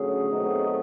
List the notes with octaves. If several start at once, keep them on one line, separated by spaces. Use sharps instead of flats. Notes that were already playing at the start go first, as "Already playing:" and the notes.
Already playing: D3 F#3 A3 C#4 G#4
B2 F#3 A3 C4 D#4